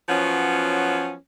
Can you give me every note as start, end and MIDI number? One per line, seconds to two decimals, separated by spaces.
0.09 1.14 53
0.09 1.14 54
0.09 1.14 59
0.09 1.14 61